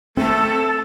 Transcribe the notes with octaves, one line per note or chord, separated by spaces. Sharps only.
A3 C4 A4